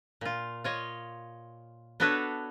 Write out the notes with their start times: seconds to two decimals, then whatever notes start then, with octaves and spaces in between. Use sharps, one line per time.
0.21 A#2 F4
0.64 F4 C#5 D#5
2.00 B3 D4 F#4 A4 B4 C#5